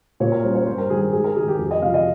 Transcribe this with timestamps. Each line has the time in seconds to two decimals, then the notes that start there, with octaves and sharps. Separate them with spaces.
0.20 A#2 C#5
0.32 A#4
0.43 G3 C#4 C5
0.55 C#5
0.67 G2 C5
0.78 A#4
0.90 D#3 G3 G#4
1.01 G#4
1.13 G#2 G#4
1.24 A#4
1.36 D#3 G#3 G#4
1.48 G4
1.59 F2 G#4
1.71 D#5
1.82 C3 F3 F5
1.94 D#5